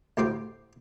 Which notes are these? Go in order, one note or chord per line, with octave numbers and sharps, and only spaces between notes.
D2 A2 G4 C5 F5 G5